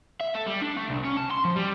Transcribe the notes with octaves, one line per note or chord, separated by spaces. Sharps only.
E5
A4
G3
D4
A3
C2
C#4
A5
C6
F3
G3